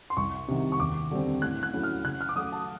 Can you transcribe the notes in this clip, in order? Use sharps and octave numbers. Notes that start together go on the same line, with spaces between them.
C6
C2 C#6
C3 D#3
C#6
D#2 D6
D3 G3 C4
A2 F#6
F#6
F#3 A3 C#4 E4
F6
C#3 F#6
F6
D6
F#3 A3 D#6
A5